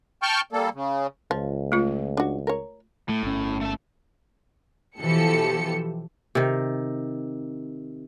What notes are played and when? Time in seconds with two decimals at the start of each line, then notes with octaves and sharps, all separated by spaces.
0.23 G5 A5 C#6 F6 G6
0.53 G3 A#3 A4
0.74 C#3
1.31 C#2 F3
1.72 A3 F4
2.17 D4 F#4
2.47 A#4 C#5
3.09 A2 A3
3.23 G1 C#4
3.61 A3 A5
5.00 B2 E3 F3 G4 A4 C#7
6.35 C3 D#3